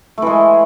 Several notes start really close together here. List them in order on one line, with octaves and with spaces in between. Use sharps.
A3 E3 G#3